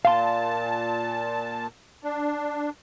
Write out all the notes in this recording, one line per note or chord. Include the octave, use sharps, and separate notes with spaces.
A#2 F5 A5 C6
D4